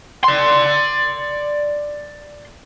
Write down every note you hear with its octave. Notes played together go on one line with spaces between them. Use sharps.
D5 C6